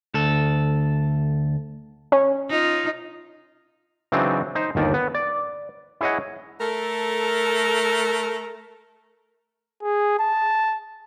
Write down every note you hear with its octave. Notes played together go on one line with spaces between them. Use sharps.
D2 A4
C#4
D#4 F4
C#3 E3 F#3 C4 D4 D#4
D#4 C5
G1 D#2 D#3 D5
B3
D5
E4 G#4 C#5 D#5 F#5
A3 A4 A#4
G#4
A5